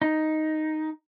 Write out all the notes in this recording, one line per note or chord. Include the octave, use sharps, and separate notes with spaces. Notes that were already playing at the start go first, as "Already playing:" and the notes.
D#4